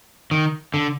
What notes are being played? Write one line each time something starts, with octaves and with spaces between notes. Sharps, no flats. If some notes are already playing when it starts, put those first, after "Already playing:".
D#3
D3